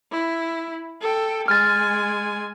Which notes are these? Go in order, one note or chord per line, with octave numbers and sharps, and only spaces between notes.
E4
A4 G5
G#3 G#5 F6 A6